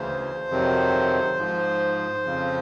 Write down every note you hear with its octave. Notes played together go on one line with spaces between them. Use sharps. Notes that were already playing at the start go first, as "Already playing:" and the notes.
Already playing: D2 C#3 E3 C5
F2 C3 D#3 F#3
G#2 F3
F2 C#3 F3